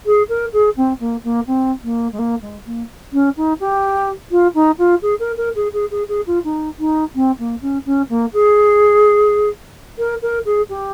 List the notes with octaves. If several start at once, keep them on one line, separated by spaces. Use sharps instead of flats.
G#4
A#4
G#4
C4
A#3
A#3
C4
A#3
G#3
A#3
G#3
A#3
C#4
D#4
G4
F4
D#4
F4
G#4
A#4
A#4
G#4
G#4
G#4
G#4
F4
D#4
D#4
C4
A#3
C#4
C#4
A#3
G#4
A#4
A#4
G#4
G4